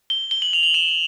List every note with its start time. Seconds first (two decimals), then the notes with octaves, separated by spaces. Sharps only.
0.10 G7
0.31 G7
0.42 F#7
0.53 F7
0.63 F#7
0.74 E7